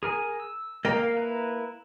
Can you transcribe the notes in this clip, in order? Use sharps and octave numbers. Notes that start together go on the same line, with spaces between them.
G#4 A#4 G#5
E6
A#3 D#5 G5 A#5
A#4 F5
E4 B4 A#5